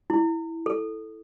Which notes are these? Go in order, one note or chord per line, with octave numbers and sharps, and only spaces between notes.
E4
A4